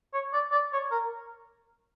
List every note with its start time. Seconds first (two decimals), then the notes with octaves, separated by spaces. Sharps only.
0.13 C#5
0.33 D5
0.52 D5
0.73 C#5
0.92 A#4